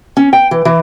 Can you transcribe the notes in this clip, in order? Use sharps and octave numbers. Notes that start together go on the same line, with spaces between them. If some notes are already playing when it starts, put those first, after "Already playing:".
C#4
G5
E3
E3